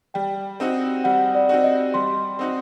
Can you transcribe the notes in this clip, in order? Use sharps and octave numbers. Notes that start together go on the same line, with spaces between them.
G3 G5
C4 D#4 F#4
G3 F#5
D5
C4 D#4 F#4
D#5
G3 C6
C4 D#4 F#4